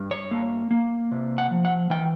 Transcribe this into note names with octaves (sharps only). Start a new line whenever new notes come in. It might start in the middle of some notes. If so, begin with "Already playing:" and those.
Already playing: G2
C#5
A#3
A#3
C3
F#5
F3
F#5
E3 G5